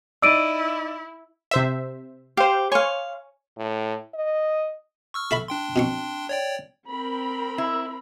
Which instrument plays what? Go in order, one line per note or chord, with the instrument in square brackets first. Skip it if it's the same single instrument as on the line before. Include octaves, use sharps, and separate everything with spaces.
[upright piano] D#4 D5 [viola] E4 [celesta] E6 D7 D#7
[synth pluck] C3 C5 E5
[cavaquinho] G4 [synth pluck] C5 F5
[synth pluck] C#5 G#5 C#6 [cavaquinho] F5 C6
[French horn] A2
D#5
[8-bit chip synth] C#6 E6 F6
[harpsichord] A4 E5 B5
[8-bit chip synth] D4 G5 C6
[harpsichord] B2 C4 C#6
[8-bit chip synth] C#5 D5 G5
[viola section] C4 A#4 B5
[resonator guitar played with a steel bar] E4